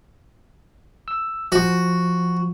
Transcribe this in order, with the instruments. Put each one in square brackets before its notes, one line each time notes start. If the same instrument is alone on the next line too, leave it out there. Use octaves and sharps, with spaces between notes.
[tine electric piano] E6
[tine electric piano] F3 [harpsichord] F#4